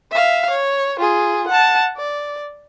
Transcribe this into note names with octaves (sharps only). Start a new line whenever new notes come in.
E5 F5
C#5
F4 G#4
F#5 A5
D5